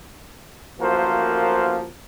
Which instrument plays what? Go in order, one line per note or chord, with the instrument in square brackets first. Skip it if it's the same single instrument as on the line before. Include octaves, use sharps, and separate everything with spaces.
[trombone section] A1 F3 A#3 F#4 A#4 C5